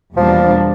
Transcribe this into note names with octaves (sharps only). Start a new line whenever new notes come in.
E2 B2 F3 G3 A#3 D4